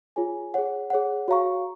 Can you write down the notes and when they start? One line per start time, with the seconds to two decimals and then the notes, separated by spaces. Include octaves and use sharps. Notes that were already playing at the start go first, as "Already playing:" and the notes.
0.16 F4 G#4 C#5 G#5
0.54 G#4 C#5 F#5
0.90 G#4 C#5 F#5
1.28 F#4 C#5 F5 A#5 C#6